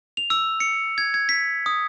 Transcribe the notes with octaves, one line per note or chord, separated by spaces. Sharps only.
F7
E6
C#7
G#6
G#6
B6
D#6